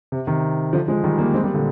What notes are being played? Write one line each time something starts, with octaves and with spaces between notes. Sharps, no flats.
C3
C3 D#3
D3 F3
F3 G#3
D#3 G3
G3 A#3
G#3 C4
G3 A#3
A#2 D3